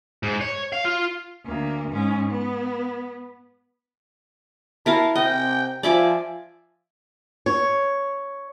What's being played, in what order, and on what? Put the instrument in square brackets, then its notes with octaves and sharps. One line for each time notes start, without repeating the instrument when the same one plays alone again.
[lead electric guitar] G#2
C#5
F5
F4
[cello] D2 A#3
G#2 C#4
B3
[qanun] E4 A#4 F5 [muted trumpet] A5
[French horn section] C3 [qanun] D#5 [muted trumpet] G5
[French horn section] F3 [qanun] D5 E5 D6 [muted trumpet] G#5
[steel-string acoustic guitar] C#5